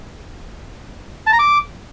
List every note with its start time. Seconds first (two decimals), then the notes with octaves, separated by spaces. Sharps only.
1.27 A5
1.33 A#5
1.39 D6